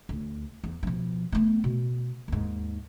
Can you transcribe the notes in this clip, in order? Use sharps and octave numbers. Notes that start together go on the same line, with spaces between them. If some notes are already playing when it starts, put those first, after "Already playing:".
D2
E2
B2 F3
A3 B3
B2
D#2 G#2